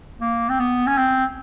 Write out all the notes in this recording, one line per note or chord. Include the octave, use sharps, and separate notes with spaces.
A#3
C4
B3
C#4
C4